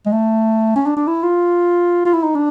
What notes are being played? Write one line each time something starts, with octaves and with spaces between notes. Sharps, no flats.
G#3
A3
C#4
D4
D4
E4
F4
F4
E4
D#4
D4